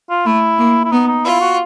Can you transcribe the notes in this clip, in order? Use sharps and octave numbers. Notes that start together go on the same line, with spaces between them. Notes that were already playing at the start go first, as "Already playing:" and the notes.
F4
A3 E4
A#3
E4
B3 D#4
D#4
E4 F4
F#4